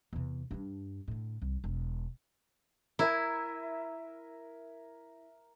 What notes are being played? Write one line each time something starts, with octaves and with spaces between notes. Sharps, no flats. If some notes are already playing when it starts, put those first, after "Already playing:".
E2 C3
G2 D4
A2 D3
C2
E1
E4 A#4 E5 G#5